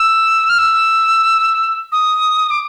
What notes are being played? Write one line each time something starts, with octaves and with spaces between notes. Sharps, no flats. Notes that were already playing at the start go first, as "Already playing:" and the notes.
Already playing: E6
F6
E6
D#6
D6